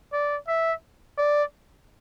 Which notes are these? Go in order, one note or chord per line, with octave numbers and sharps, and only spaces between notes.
D5
E5
D5